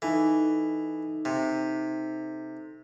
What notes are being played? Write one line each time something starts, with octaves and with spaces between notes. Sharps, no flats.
E3 D#4 A4
C3